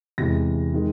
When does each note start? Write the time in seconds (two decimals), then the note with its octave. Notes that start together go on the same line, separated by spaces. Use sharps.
0.18 E2 C3 E3 G#3 A#6
0.74 D#3 G#3